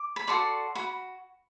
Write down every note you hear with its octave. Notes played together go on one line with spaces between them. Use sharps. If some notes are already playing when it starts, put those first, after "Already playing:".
Already playing: D6
B5
F#4 A4 D5 C6
F#4 B5